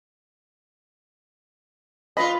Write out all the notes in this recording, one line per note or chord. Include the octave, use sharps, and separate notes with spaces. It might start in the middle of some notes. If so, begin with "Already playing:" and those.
F4 B4 D#5 B5